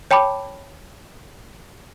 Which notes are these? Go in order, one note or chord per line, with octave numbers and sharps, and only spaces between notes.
C#5 G5 A5 B5 D6